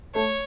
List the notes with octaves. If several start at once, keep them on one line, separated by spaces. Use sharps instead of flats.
A3 C#5